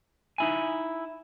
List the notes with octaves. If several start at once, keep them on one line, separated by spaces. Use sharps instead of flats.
D#4 E4 G#5